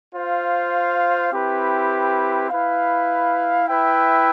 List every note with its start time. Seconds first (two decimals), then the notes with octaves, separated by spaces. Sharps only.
0.15 F4 C5 F5
1.33 C4 E4 G4 B4
2.50 E4 B4 F5
3.69 E4 B4 E5 G5